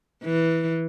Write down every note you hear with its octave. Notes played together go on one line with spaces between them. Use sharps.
E3